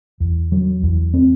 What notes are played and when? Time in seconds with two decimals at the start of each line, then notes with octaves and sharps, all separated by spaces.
0.20 E2
0.52 F#3
0.83 E2
1.14 C4